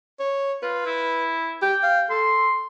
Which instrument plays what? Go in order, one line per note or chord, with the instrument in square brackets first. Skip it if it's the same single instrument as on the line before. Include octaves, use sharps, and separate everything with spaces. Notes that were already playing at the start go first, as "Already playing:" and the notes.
[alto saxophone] C#5
[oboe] F4 [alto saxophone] B4
[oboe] E4
[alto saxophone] G4 [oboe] G5
[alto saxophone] F5
[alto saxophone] A4 [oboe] C6